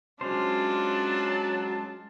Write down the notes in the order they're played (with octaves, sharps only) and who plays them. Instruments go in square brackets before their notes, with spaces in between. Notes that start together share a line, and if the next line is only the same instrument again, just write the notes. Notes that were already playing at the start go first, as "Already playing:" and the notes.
[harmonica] F#3 [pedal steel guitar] G#3 C#4 C5 [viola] D4 F4 [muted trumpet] A5